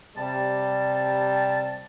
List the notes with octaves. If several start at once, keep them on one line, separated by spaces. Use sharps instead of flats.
C3 G3 A5